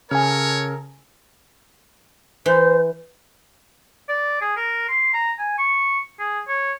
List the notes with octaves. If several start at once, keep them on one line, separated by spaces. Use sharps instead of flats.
C#3 A4 A#4 C#5 G#5 F6
E3 C5
D5
G#4
A#4
C6
A#5
G#5
C#6
G#4
C#5